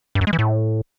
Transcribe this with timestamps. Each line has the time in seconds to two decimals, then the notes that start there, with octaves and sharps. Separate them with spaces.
0.15 G2
0.21 F#2
0.27 G#3
0.33 E3
0.39 A2